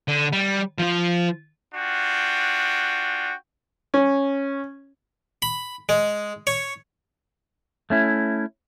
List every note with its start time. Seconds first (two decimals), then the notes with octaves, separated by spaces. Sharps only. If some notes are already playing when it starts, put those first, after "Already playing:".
0.08 D3
0.33 G3
0.78 F3 F4
1.74 D4 F4 F#4 G5
3.94 C#4
5.42 B5
5.89 G#3
6.47 C#5
7.90 A3 C#4 E4